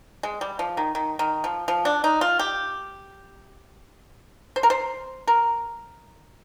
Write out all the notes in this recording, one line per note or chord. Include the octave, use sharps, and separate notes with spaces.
G#3
G3
F3
D#3
D#3
D#3
F3
F3
D4
D#4
F4
G4
C5
A#4
C5
A#4